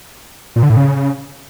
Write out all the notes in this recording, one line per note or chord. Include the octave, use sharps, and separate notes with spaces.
A#2
D3
A2
C#3